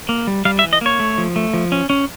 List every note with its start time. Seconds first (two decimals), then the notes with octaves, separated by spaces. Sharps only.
0.09 A#3
0.27 G3
0.45 G3 F5
0.59 E5
0.64 E3
0.73 D#5
0.81 A#3 C#5
0.99 A3
1.18 F3
1.36 A3
1.54 F3
1.72 C#4
1.90 C#4